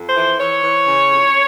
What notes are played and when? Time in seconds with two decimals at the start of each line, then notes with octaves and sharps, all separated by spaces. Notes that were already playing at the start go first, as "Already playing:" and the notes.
Already playing: F2
0.09 C5
0.16 E3
0.40 E3 C#5
0.64 E3
0.87 C#3
1.10 F2